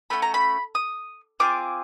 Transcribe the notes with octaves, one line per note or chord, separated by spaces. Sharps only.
A3 C#4 F#4 B5
A#5
B5
D#6
C4 F4 G#4 D6